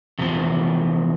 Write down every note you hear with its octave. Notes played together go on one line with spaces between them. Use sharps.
E2 C3 F3